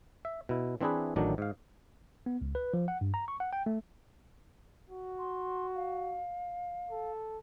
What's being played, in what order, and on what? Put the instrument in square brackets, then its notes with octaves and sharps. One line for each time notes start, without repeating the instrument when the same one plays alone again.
[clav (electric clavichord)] E5
B2 E4
E3 C4 D4 E4 G#4 B4
A1 A2 D#3 F#3 D4
G#2 F5
[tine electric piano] B3
C#2
B4
F3
F#5
G2
A#5
C#6
F#5
G5
A3
[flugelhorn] F#4
[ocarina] C6
F5
[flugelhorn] A4